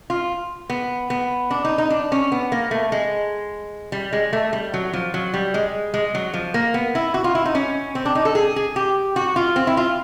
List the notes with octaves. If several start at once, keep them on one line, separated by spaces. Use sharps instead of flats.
F4
B3
B3
D4
D#4
D#4
D4
C#4
B3
A#3
A3
G#3
G3
G#3
A3
G3
F#3
F3
F#3
G3
G#3
G#3
F#3
F3
A#3
B3
E4
F#4
F4
E4
D#4
C#4
C4
D4
D#4
A4
G#4
G#4
G4
F#4
F4
C4
E4
F4